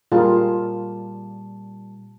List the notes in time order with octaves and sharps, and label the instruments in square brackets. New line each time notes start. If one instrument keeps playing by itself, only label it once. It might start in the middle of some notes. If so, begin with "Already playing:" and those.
[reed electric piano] A#2 G3 A5 [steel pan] F4 G#4 A#4